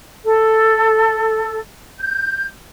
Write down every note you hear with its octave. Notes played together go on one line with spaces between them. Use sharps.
A4
G6